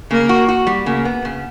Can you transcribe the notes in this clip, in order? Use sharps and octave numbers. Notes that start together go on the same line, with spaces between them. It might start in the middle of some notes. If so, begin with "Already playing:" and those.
C#3 A#3
F#4
F#4
G3
C#3 A#3
B3
C#3